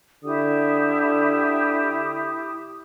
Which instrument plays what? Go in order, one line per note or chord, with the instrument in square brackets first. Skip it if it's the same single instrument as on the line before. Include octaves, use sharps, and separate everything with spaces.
[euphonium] D3 [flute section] E4 G4 D#6